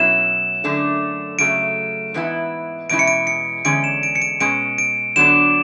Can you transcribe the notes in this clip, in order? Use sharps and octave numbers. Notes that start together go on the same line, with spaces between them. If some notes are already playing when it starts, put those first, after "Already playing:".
Already playing: B2 F#3 C#4 E4 E7
F#2 D3 A3 D4
C#3 F#3 A3 D7
G#2 E3 B3 E4
E2 B2 G#3 C#4 E4 D7
C#7
D7
C#7
E2 D3 G#3 C#4 D7
E7
D7
C#7
D7
B2 G#3 C#4 D7
D7
D3 F#3 B3 D4 E7